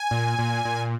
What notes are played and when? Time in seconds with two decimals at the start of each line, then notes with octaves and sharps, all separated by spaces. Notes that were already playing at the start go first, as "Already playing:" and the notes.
Already playing: G#5
0.11 A#2
0.39 A#2
0.65 A#2